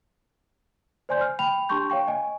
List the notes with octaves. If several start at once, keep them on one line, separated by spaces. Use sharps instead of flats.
C5 D5 G#5 C6 G6
F6
G5 B5 F7
D4 G4 A5 C6 C#6 G6
C#5 F5 G5 C#6
D#5 G#5